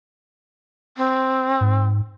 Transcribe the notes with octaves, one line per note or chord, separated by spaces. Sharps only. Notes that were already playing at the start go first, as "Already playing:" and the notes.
C4
G#2